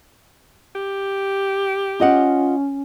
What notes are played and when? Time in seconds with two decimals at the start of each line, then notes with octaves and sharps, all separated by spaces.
0.75 G4
2.00 C#4 F4 D#5 F#5